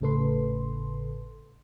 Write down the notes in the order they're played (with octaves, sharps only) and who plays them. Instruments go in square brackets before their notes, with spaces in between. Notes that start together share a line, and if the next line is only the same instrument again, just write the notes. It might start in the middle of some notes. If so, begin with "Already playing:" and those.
[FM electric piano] G#1 A2 C#3 A4 B4 C6